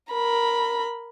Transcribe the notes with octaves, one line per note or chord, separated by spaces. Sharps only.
A#4 B5